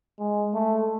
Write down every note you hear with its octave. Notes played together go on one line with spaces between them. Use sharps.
G#3
A3